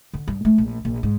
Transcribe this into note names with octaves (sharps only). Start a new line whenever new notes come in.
D3
G2
A3
A#1
A#1
G#2